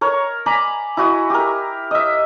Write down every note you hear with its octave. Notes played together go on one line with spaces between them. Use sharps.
A#4 C#5
D5 G#5 A#5 B5
E4 F#4 D#6
G4 A#4
D#5 E5